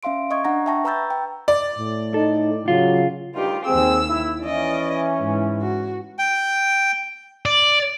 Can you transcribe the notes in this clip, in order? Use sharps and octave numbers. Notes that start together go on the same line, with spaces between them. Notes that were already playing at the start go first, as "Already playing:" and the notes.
C#4 E5 F5 C6 D7
D#5 C#6 D#6 G#6
D4 F#5 A#5 A#6
E5 G5 A5 C#6 A#6
B4 A#5 B5 E6 G6 A6
G5
D5
A2
D#4 A4
C#3 F#3 F4
D2 G2 D#3 F4 G4
D#2 C4 G#4 E6
E4
E3 C#4 D5 D#5
G#2
F#4
G5
D5